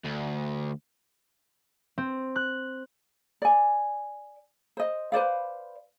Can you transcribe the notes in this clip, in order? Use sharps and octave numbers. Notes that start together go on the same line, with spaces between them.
D2
C4
F#6
D5 G#5
C5 D#5
B4 C5 D5 F5